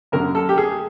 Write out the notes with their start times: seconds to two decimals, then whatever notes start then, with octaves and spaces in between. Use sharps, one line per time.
0.12 F#2 D3 F#3 A#3 A#4
0.35 A4
0.49 G4
0.58 G#4